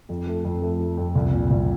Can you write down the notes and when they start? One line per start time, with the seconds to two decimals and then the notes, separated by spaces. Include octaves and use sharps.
0.09 F2
0.27 A3
0.44 F2
0.62 A3
0.80 A3
0.97 F2
1.15 C2
1.33 A#2
1.50 C2